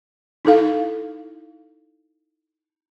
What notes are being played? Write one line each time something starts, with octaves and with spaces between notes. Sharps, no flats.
D#4 E4 A4 F5